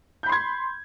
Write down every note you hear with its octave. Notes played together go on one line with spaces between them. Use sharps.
B5 C6 G6 G#6